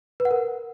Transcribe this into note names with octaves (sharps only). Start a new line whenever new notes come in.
B4
F#5
A#4